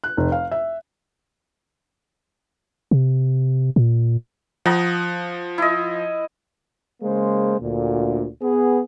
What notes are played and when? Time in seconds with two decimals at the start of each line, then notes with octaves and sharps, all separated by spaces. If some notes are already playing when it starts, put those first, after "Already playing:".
0.04 F#6
0.17 F1
0.32 F5
0.52 E5
2.91 C3
3.76 A#2
4.66 F3 F#5 A#5 D#6
5.58 E4 D#5
7.03 C#3 G#3 A#3 C5
7.61 D2 A#2
8.42 B3 G#4